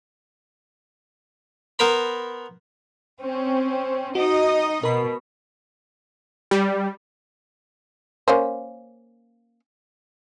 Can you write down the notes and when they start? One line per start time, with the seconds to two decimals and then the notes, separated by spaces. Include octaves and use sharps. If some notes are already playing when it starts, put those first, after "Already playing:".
1.79 B3 A#4 C5 A#5 B5
3.20 C4 C#4
4.15 D#4 F#4 D#5
4.83 B2 A#4 B5
6.51 G3
8.28 A#3 C#4 C5